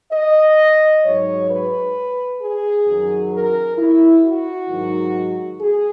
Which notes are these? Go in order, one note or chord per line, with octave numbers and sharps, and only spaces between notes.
D#5
G#2 F#3 C#5
B4
G#4
F#2 D#3 F#3
A#4
E4
F#4
G#2 D#3 F#3
G#4